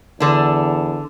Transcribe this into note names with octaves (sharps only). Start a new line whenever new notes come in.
E2 D3 D4